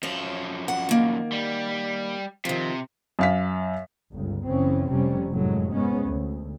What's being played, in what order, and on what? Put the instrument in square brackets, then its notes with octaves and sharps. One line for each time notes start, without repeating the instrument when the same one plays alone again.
[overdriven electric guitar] F#2 F3 [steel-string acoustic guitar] C#5
[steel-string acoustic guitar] F#5
D#3 A#3
[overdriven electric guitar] G3
[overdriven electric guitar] C3 [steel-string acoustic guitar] D#3 F3
[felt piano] F#2 F5 B6
[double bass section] G1 C#2
F#1 C#3 E3 C4 C#4
F1 C3 G3 C#4
F1 F#2 A2 F#3 G#3
G#2 G#3 B3 C#4
D2